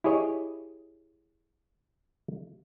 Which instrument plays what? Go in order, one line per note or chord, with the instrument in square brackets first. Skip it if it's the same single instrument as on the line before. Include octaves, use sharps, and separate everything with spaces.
[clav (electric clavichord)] E4 G4 G#4 C#5 D#5